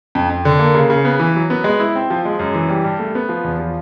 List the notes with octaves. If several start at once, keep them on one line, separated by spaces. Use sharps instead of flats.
F2
F2
D3
A#3
C#3
C#3
B3
E3
F#3
B3
G#3
E4
C4
F3
G#3
F#2
E3
G3
G2
A3
B3
F3
E2
F3